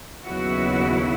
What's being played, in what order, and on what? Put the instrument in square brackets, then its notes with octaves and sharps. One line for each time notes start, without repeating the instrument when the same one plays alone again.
[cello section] D#2 C#3 F#3 B3 E4 F#4